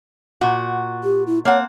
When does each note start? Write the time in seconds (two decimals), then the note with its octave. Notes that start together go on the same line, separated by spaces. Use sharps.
0.41 A#2 F#4
1.04 G4
1.27 E4
1.45 A#3 C4 C#5 F#5